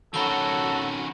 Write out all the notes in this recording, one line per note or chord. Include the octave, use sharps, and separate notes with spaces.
D#3 C#4 F#4 A4 A#5 B5 G7